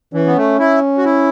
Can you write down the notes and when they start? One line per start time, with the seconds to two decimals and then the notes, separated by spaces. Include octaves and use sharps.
0.14 E3 C#4
0.27 B3
0.37 A3
0.59 E4
0.98 F#4
1.05 E4